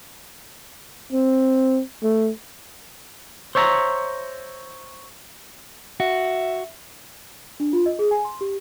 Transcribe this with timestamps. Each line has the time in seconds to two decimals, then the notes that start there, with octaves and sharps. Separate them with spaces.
1.13 C4
2.03 A3
3.55 C5 C#5 E5 G#5 A#5
6.00 F#4 E5
7.60 D4
7.73 F4
7.86 D#5
7.99 G#4
8.11 G#5
8.25 C6
8.41 G4